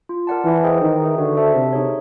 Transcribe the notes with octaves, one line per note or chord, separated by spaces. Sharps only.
F4
A#4 D5 F#5 A5
E3 E4
G#4 C5 D#5 G5
D#3 D#4
G#4 B4 E5
D3 F#4
A4 C5 E5 A5
C3 B3
D#4 G#4 C#5